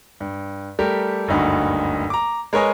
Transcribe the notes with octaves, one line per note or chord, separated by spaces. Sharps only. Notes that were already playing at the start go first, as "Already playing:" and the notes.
G2
G3 A3 G4 A#4
F#1 D2 G2 D#4 F#4
A#5 D6
G#3 A#4 B4 C#5 D#5 G#5